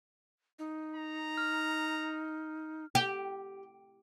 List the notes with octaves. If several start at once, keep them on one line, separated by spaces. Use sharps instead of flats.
D#4
A#5
F6
G4